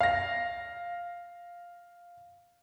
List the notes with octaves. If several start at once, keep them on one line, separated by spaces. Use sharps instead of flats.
F5 A#6